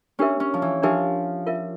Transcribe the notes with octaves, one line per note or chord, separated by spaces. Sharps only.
C#4 D4 G4 A#4 E5
C#4
F3
E3
F3 D4 G4 A#4 E5
F4 A#4 E5